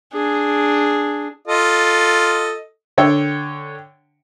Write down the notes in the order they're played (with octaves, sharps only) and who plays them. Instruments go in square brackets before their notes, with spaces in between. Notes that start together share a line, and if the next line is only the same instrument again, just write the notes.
[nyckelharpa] D4 G#4
[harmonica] F4 A4 D#5
[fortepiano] D3 C#5 G5 E6